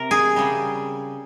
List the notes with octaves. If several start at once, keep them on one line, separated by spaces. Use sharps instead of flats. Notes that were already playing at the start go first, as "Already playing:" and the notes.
Already playing: C3 A#4
G#4
C#3 G3